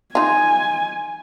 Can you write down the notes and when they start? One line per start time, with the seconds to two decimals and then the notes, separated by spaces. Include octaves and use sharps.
0.15 D#4 F4 G#5